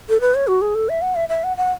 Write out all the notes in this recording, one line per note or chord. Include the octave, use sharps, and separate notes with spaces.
A4
B4
C#5
F#4
G#4
A4
E5
F#5
E5
E5
F#5
F#5